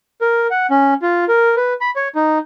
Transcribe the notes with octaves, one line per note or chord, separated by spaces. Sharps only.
A#4
F#5
C#4
F4
A#4
B4
B5
C#5
D#4